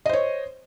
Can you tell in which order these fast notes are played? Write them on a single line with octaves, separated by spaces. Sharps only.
D#5 C5 C#5